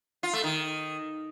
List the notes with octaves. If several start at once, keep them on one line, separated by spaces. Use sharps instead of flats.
F4
A3
D#3